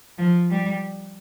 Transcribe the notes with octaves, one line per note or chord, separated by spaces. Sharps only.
F3
G3